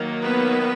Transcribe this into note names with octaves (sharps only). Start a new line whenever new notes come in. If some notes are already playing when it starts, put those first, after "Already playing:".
Already playing: D#3 F#3 A#3
B3 B4